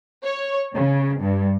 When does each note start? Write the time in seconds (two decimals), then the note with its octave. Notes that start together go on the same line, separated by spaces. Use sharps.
0.24 C#5
0.74 C#3
1.20 G2